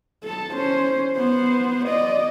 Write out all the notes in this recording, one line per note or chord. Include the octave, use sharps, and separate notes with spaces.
A4 A5
C#4 C5
B3 C5
D5 D#5